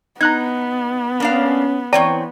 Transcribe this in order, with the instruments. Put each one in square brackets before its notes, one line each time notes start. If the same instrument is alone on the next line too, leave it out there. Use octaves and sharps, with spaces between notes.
[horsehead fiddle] B3 [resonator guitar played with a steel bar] D#4 [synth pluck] A#5 F#6 G#6
[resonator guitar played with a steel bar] A#3 D4 F5 [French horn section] C#4
[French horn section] E3 [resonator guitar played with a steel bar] C4 C#5 G5 [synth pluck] D5 A#5 D#7